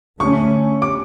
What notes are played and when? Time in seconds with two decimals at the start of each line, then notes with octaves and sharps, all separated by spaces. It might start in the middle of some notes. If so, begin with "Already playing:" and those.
0.20 D2 D3 A3 C#4 C#6
0.82 D6